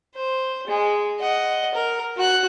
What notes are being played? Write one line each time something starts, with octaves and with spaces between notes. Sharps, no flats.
C5
G#3
D#5 F#5
A#4
F#4 F#6